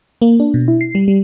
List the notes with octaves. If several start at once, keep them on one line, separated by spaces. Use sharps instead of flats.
A#3
D4
B2
E4
C7
G3
G3